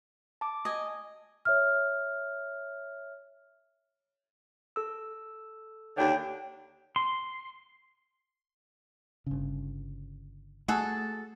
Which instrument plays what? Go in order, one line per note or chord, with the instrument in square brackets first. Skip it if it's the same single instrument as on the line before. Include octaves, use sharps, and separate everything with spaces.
[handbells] A5 D6
[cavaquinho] D#5 G#5
[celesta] C#5 E5 F6
[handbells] A4 E6
[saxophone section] D#2 D3 D4 [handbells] C#5 G5 G6
[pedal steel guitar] C6
[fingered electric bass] G1 C#3
[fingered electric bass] A3 [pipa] F#4 G#4 A4